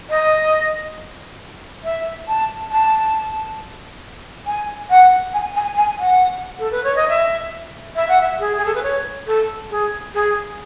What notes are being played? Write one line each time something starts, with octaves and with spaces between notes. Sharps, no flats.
D#5
E5
A5
A5
G#5
F#5
G#5
G#5
G#5
F#5
A4
B4
C#5
D#5
E5
E5
F#5
E5
G#4
G#4
A4
B4
C#5
A4
G#4
G#4